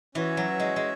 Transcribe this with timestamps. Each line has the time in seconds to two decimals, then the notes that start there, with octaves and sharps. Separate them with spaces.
0.15 E3 C#4 F#4 C#5 E5
0.37 F#3
0.60 G#3
0.76 G#3